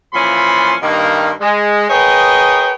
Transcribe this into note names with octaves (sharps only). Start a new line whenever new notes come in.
A#2 E3 F3 C#4 B5 C6
G2 D#3 A#3
G#3
G#4 A#4 B4 C#5 D#5 G5